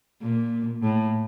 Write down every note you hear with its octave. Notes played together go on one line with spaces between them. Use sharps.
A#2
A2